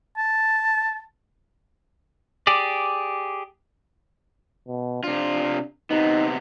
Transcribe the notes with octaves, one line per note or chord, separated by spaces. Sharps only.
A5
G4 G#4 D5
B2
C3 D4 F4
C3 B3 D#4